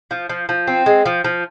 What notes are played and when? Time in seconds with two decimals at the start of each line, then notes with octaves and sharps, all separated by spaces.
0.11 F3
0.29 F3
0.49 F3
0.67 C4
0.86 G#3
1.05 F3
1.24 F3